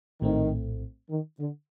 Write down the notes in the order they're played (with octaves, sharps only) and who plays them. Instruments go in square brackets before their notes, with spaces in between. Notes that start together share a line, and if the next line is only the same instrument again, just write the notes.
[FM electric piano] A#1 A2 A3 C4 [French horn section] D#3
[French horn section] D#3
D3